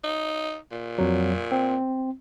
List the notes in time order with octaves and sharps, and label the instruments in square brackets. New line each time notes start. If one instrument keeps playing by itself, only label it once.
[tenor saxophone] D#4
A#2
[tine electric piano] F2 F#3
C4